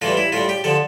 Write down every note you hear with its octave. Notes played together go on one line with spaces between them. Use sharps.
A2 E3 G3 F4
E4
A2 G3 F4
G4
D3 F3 A4